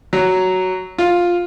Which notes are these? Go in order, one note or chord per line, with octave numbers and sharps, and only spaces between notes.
F#3
F4